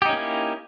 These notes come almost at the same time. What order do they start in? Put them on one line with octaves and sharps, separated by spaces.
G4 D#4 C#4 A#3 E4